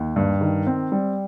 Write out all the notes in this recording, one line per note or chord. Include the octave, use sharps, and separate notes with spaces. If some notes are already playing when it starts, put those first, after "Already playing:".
Already playing: D#2
G2
D#3
C4
G3